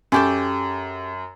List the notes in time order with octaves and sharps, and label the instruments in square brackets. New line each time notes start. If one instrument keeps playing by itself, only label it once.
[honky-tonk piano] F#2 [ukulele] C#4 G4 A4